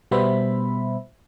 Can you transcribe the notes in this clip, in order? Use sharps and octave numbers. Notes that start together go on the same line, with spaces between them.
B2 G3 B3 C5 E5 B5